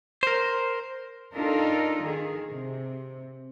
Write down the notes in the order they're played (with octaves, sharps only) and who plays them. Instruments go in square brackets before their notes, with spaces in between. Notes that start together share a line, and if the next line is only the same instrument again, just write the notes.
[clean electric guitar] A#4 C5
[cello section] D4 D#4 F4 A4 A#4 D#5
D#3 G#4
C3